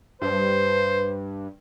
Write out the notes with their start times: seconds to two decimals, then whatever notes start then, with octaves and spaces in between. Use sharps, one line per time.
0.22 G2 B4 C5